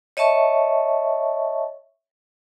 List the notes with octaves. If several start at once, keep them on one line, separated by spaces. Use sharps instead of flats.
C#5 D#5 E5 A5 C#6